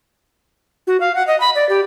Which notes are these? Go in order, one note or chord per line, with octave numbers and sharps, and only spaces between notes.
F#4
F5
F#5
D#5
B5
D5
G4